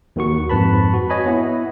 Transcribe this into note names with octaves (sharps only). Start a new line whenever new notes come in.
D#2 D#3 F#4 C#6
F2 G#2 B4 A5 B5
F#4
C#5 D#5 G#5 B5
B3 E4